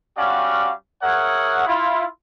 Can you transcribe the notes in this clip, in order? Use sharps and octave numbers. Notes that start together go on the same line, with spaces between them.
G3 C#4 F#4 D5 F5 F#5
G#4 A#4 C#5 E5 F#5
E4 F4